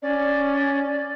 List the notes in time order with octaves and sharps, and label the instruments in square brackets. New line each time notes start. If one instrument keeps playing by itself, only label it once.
[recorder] C#4 [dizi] D5